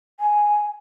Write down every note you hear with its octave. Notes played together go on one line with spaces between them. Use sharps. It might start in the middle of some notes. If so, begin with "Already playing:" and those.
G#5